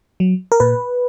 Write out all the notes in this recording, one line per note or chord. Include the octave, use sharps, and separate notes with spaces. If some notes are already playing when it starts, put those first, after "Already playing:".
F#3
A#4
A#2 B4